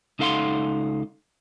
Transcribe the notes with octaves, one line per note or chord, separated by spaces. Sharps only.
C#2 D#4 A4 F5 F#5 C6